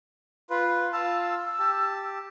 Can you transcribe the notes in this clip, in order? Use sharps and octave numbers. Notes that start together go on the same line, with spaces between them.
F4 B4
F4 F5 A5 E6
G4 A5